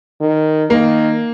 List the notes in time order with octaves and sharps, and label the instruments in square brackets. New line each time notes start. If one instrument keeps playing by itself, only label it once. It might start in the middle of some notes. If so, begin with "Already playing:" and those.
[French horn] D#3
[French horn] D#3 [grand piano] A#3